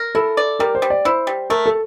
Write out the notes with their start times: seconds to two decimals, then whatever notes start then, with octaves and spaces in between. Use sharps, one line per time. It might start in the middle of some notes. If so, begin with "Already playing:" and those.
Already playing: A#4
0.15 E4 A4
0.37 D5
0.59 G3 A#4
0.75 C5
0.82 G3
0.90 D5
1.05 E4 C5
1.27 G3
1.50 A3 A#4
1.66 A4